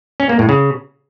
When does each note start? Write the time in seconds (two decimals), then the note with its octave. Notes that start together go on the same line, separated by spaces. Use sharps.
0.20 C#4
0.29 A#3
0.39 A2
0.49 C#3